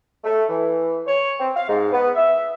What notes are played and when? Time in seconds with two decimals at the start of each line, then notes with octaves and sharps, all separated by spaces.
0.24 A3
0.49 E3
1.06 C#5
1.39 C4
1.55 F5
1.68 G#2
1.92 B3
2.15 E5